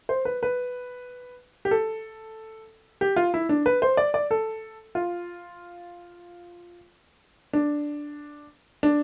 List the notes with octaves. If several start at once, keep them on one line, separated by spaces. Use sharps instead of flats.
C5
B4
B4
G4
A4
G4
F4
E4
D4
B4
C5
D5
D5
A4
F4
D4
D4